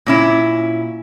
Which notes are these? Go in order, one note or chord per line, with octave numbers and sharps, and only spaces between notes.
A#2 C#4 E4